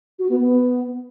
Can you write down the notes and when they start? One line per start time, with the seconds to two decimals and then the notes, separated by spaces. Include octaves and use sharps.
0.19 F#4
0.29 B3
0.39 B3